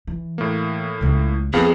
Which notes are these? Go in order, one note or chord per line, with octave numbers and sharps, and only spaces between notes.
E3
A2 A#3
C#2 C#3
F2 A#3 B3 G#4 F5